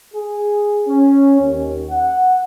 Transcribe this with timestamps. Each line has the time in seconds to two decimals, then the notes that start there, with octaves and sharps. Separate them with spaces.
0.14 G#4
0.88 C#4
1.41 D#2
1.90 F#5